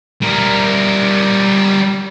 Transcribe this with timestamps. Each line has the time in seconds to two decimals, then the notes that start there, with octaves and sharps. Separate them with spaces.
0.22 G3 A#4